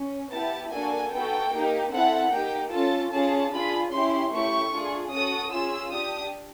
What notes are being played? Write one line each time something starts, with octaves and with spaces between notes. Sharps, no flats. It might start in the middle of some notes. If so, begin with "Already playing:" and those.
Already playing: C#4
B3 E4 G4 A5
A#3 D4 F#4 A4 G#5
B3 D#4 F#4 A4 G5
A#3 D#4 G4
C4 E4 A4 F#5
A#3 D#4 G4 G5
C#4 F4 A4 A5
C#4 F4 G#4 A5
D4 F4 G#4 B5
C#4 E4 G4 C6
A3 C#4 E4 G4 C#6
D4 F4 G#4
C#4 F#4 A4 D#6
C#4 F4 G#4 E6
D4 G4 D#6